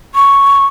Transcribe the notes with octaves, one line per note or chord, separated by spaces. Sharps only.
C#6